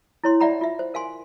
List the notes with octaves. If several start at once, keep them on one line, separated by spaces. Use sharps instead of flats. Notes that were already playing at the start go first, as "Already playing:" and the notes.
E4 C#5 C6
D5 E5 F#5 A#5 B5
F4 E5
C5
A#4 F5 G#5 C6